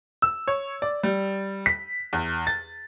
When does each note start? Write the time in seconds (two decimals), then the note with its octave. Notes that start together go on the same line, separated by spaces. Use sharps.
0.22 E6
0.48 C#5
0.82 D5
1.03 G3
1.66 B6
2.13 E2
2.47 A6